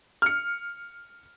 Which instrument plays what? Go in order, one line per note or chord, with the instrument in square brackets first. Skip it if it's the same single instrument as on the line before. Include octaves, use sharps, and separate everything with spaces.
[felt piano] F6 C#7